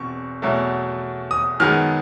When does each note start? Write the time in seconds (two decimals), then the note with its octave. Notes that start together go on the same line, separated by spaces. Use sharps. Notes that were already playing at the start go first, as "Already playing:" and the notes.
Already playing: E2 B2 C4 C#6
0.42 E2 B2 F#3 A3
1.31 D#6
1.60 F#2 D#3 G#3 B3 F6